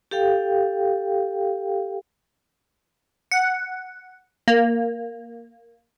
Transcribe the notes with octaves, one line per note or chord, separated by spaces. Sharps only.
G4 A4 F5 G5
F#5
A#3